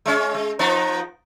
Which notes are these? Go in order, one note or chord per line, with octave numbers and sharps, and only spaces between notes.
G#3 C#4
G#3
F3 B3 D#4